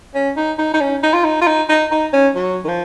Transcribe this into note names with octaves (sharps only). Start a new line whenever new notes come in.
C#4
D#4
D#4
D#4
C#4
D#4
F4
D#4
F4
D#4
D#4
D#4
C#4
F#3
D#3
F3